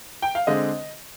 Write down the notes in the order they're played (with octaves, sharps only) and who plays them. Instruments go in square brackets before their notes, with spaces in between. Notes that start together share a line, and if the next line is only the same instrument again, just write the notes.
[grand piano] G5
F5
D3 G#3 C4 D#5